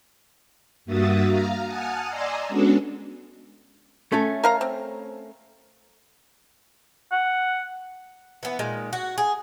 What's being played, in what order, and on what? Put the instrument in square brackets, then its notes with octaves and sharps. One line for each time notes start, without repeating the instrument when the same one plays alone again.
[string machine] G2 A#3 F#4 E5 D#6 A6
F5 A#5
F#5 G#5 A5 D#6 F6
D5 D#5 G#5 A#5 C6 E6
G#3 B3 C#4 D4 F#4 A4
[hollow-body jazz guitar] A3 C#4 A4
[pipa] A#4 F5 A#5
C4
[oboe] F#5
[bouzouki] E3 B3
A#2 D#3 G#3
F#4
G#4